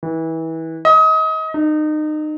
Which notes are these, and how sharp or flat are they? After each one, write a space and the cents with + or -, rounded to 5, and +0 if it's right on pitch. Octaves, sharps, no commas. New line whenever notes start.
E3 -25
D#5 +30
D#4 -30